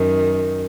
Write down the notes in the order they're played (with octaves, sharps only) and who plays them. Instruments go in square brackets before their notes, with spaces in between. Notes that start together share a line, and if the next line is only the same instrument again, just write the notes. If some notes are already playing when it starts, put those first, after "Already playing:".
Already playing: [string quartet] F#2 D#3